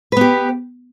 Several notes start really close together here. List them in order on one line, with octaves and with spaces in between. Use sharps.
B4 B3 G4